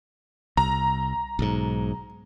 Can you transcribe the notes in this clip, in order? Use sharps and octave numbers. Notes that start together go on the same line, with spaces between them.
C2 A#5
B1 G#2